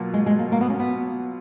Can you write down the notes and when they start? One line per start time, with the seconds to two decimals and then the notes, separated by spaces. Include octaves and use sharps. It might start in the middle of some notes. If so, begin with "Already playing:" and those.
Already playing: B2 F#3 A#3 F4
0.14 G#3
0.26 G#3
0.39 A#3
0.52 A#3
0.61 B3
0.70 C#4
0.79 B3